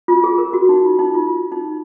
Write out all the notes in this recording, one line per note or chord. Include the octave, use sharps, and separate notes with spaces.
F4
G#4
A#4
F#4
D#4
F4
D#4
F4
F4
D#4